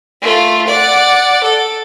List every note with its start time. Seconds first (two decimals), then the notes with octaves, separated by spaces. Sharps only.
0.22 A3 F4
0.67 D5 F#5
1.43 A4